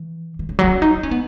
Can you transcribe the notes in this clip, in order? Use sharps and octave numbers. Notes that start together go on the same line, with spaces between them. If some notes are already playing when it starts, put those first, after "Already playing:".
Already playing: E3
E3
C#3
F#3
B3
C#4
D#4
D#4
C#4
B3